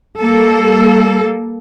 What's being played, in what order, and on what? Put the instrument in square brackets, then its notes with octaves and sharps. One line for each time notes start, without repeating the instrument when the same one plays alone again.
[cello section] G3 A#3 A4